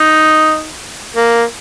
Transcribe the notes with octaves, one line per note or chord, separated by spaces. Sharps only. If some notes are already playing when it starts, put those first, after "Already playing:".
Already playing: D#4
A#3